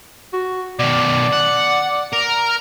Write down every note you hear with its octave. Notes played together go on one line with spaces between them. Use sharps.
F#4
B2 D#3 D5
F#5
A#4